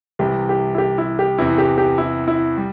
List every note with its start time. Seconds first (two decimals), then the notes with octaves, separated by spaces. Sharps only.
0.19 C2 C3 E3 G4
0.49 G4
0.75 E4
0.78 G4
0.98 E4
1.19 G4
1.38 E2 C3 E3 E4
1.58 G4
1.78 G4
1.98 E4
2.28 E4
2.57 G3